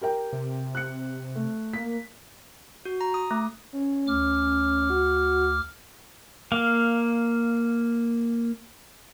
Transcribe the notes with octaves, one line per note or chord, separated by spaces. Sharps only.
G4 A#4 G5
C3
F#6 C#7
A3
A#3 B6
F#4
A#5
D#6
A3
C#4
D2 D6 F6
F#4
A#3 F5